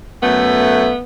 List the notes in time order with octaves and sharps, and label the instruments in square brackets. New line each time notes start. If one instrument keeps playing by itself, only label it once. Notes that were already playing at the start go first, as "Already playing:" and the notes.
[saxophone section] F#2 A3 [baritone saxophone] B3